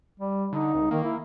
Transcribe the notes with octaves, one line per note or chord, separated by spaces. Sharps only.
G3
D3 D#4
C#2
D#3 A#3
E4